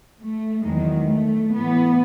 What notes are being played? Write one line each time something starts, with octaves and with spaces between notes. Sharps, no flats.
A3
E2 D#3 F#3 G#3
A3
A2 E3 B3